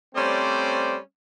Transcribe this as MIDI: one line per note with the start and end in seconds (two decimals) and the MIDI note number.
0.15 0.97 55
0.15 0.97 57
0.15 0.97 60
0.15 0.97 61
0.15 0.97 72
0.15 0.97 74